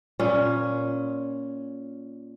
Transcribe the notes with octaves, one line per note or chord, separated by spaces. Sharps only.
A#2 C#4